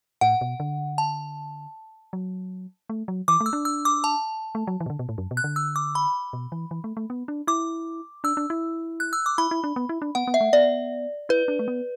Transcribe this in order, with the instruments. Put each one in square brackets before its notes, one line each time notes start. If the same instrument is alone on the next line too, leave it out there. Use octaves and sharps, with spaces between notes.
[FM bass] A2 [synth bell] F#5
[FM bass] B2
D3
[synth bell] A5
[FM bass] F#3
A3
F#3
[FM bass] E3 [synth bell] D6
[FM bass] A3
[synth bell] E6
[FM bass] D4
[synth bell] E6
D6
A5
[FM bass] A3
F#3
E3
B2
D3
B2
A2
F#2
B2
[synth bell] F#6
[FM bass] D3
[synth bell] E6
D6
B5
[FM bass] B2
E3
E3
A3
A3
B3
D4
[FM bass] E4 [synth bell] D6
[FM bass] D4 [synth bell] E6
[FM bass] D4
E4
[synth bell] F#6
E6
D6
[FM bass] E4 [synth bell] B5
[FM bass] E4
D4
B3
E4
D4
[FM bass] B3 [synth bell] F#5
[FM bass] B3
[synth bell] E5
[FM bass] A3
[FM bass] B3 [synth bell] D5
[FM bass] E4 [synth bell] B4
[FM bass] D4
A3
B3